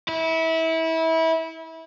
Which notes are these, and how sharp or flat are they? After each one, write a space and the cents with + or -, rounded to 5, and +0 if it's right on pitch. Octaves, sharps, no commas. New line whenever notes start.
E4 -25